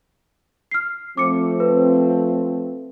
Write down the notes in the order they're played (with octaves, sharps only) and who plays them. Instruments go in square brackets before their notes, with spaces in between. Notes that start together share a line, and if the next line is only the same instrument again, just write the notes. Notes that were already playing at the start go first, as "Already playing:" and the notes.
[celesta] F6 C7
[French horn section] F3 A3 C4 [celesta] D6 C#7
[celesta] B4